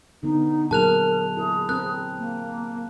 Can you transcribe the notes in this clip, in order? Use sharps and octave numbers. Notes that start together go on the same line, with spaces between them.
D3 B3 D#4
A#2 F#3 G#4 A#4 A5 F#6 F7
E4 G#4 A#4
C4 A#4 F#6
A#3